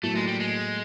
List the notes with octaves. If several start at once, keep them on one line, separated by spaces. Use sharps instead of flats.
A2 F#3 A3 A#3
G#3
G3
G#3